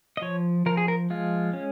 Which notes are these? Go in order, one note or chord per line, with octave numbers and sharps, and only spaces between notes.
D#5
F3 C#5
F3 A#4
G#4
A#4
G#3 F4
C#4